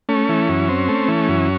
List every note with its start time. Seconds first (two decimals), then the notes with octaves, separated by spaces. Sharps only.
0.09 A3 C#4
0.29 E3
0.49 F#2
0.69 C4
0.88 A3
1.08 E3
1.29 F#2